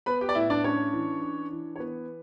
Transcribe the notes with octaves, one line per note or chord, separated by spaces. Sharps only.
B3 B4 B5
G4 G5
D5
A2 E4 E5
D4 D5
C#4 D4 C#5
E3
D4
E3
C#5
E3 B3 B4